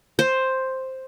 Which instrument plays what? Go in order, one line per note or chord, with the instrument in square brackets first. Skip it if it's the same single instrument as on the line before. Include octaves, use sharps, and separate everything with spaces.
[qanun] C5